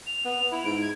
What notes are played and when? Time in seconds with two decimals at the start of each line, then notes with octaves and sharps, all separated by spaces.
0.06 F7
0.25 B3
0.52 E4
0.65 G#2 D7
0.82 G#6